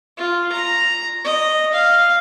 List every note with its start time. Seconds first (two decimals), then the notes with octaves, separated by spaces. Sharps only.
0.17 F4
0.52 A#5
1.24 D#5
1.73 F5